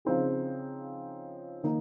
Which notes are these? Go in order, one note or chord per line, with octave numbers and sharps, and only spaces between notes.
C#3 F3 C4 D#4 G#4
D#3 A#3 D#4